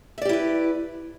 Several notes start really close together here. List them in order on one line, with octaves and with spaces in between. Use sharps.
E5 D5 G4 E4 B4